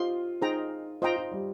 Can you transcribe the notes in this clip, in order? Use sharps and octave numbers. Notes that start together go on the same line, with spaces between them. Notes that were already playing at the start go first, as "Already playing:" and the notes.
Already playing: F4 G4 C5 D#5 C6
D#4 G#4 C5 G5 A#5
F4 C5 D#5 G5 A#5
F4
G3